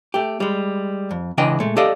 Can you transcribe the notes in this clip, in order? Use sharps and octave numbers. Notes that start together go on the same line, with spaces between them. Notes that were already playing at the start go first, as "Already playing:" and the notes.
A3 G4
G3 G#3
F2
C#2 C#3 E3 D4 D#5 G5
A#2 G#3 A3
G4 A4 D5 D#5 F5